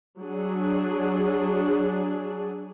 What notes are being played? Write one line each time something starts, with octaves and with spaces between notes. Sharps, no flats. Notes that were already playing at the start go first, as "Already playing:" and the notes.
F#3 D4 G#4